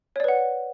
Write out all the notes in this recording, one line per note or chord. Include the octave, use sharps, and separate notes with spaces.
B4 C#5 D5 F#5